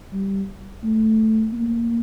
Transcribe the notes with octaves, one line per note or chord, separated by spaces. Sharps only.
G3
A3
A#3